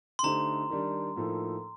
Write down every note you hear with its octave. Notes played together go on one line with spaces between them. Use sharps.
C6
D3 A3 D#4 G4 C5 A#5
D#3 G3 D4
A2 F3 A#3 D#4 A4